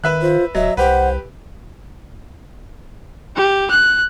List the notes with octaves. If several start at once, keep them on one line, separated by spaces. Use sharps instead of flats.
D#3 B4 E5 F#6
F4 C5
D1 F#3 D#5 E5
C2 G4 B4 C5 F#5
G4
F#6